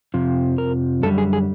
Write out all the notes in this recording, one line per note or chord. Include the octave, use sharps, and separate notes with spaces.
F2 C3 F3
A#4
F#2 D3 G3 A4
G#4
G#4